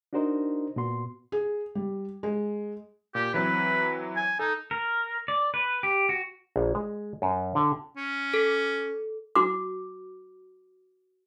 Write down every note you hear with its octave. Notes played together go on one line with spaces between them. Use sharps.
D4 D#4 F#4 A#4 C5 D#5
A#2 B3 F#4 C6
G#4
G3
G#3
A#2 G4
E3 F#3 C4 B4
G#5
D#4 A4
A#4
D5
B4
G4
F#4
A#1
G#3
F#2
D3
C#4
A4
F#4 D6